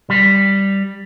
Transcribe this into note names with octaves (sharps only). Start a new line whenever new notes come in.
G3